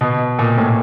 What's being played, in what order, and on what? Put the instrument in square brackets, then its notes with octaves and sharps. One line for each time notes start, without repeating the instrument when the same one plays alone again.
[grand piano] B2
A#2
A2